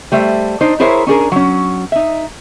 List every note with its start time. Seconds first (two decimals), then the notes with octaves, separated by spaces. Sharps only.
0.12 G3 A3 C5 E5
0.61 D4 D#4 C5
0.80 E4 G#4 A#4 C5 C#5 E5
1.07 C#4 D4 G#4 A#4
1.32 F#3 C#4
1.92 D#4 E5